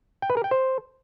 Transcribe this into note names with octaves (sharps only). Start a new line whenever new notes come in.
G5
B4
A#4
G5
C5